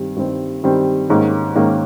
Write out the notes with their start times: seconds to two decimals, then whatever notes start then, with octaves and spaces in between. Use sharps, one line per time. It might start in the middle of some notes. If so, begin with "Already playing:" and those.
Already playing: G2 D#3 G3 C4
0.16 G2 D#3 G3 C4
0.63 G2 D#3 G3 C4
1.09 G#2 D#3 A#3 C#4
1.55 G#2 D#3 A#3 C#4